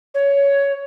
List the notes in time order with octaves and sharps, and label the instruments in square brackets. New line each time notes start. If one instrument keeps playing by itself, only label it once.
[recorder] C#5